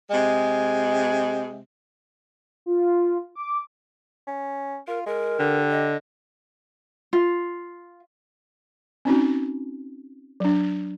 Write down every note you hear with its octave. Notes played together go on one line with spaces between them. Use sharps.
C3 G#3
F4
D6
C#4
F4 A#4
G#3 A#4
D3 G4
D#5
F4
C4 C#4 D#4 F#4
F#3 D4